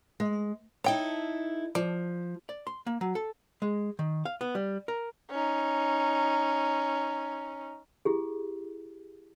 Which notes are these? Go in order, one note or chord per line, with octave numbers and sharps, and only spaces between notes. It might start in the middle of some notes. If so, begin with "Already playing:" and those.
G#3
D#4 E4 A4 C#5 G5
F3 D5
D5
C6
A#3
F#3
A4
G#3
D#3
F5
B3
G3
A#4
C#4 D#4
E4 G4 G#4